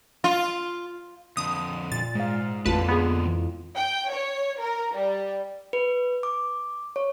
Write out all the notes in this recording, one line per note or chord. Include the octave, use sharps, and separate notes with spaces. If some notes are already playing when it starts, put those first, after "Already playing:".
F4
F2 D3 D#6
A#2 A6
G#2 G#3 F5
A1 F2 A#2 D3 F4 B4 A5
B3 G#4
E3
G5
C#5
A#4
G3
B4
D6
C#5